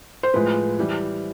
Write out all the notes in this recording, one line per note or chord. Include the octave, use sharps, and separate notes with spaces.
C5
A2 F3 G#3 B4
E3 G3